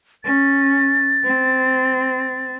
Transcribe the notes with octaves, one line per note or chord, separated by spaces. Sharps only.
C#4 A6
C4